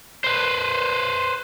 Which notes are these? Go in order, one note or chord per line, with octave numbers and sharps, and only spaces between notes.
B4 C5